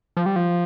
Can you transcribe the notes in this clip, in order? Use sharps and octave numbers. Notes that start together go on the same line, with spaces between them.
F3
G3
F3